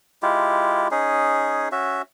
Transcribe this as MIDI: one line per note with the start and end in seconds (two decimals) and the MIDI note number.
0.22 0.88 56
0.22 0.88 64
0.22 0.88 65
0.22 0.88 67
0.91 1.69 61
0.91 1.69 63
0.91 1.69 68
1.72 2.02 61
1.72 2.02 66
1.72 2.02 76